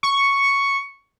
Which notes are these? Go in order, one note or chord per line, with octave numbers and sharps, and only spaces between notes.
C#6